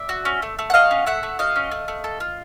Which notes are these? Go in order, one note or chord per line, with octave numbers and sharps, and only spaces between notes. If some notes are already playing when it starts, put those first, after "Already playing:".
Already playing: D5 E5
F#4
C#4
A3
A3
F#5
F#4 D#5 F5
C#4
A3 E5 F#5
A3
F#4 D#5 F5
C#4
A3
A3
A4
F4